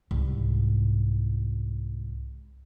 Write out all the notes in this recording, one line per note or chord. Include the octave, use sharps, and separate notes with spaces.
C2 G#2